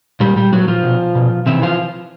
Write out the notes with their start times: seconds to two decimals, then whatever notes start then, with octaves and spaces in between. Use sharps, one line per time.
0.20 A#2 G3 G4
0.36 G3 G4
0.52 A#2 F#3 F#4
0.68 F3 F4
0.83 B2
1.15 B2
1.46 C3 E3 E4
1.62 E3 F3 F4